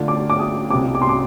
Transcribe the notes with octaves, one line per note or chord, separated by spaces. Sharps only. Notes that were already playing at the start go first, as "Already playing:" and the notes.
Already playing: D3 A3 D4 F4
D6
D6
D#6
C2 C3 G3 D6
D6
C6
D6